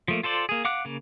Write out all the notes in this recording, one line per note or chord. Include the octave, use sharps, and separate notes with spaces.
F3 A3 A#3
F4 A4 C5 D5
A#3 G#4
F5 F#5 D6 F#6
C#3 A#3